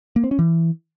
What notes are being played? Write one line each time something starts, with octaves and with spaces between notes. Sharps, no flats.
A#3
C4
C#4
E3